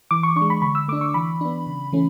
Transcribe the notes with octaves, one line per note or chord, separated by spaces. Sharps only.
E3 D6
C#6
D4 C#6
G#3
B5
D3 B5
E6
A3 D4 D6
C#6
E3 B5
B3 D4
C#3
E3 A3 C#4